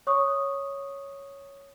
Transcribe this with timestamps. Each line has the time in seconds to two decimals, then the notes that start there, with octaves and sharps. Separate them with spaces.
0.07 C#5 C#6 D#6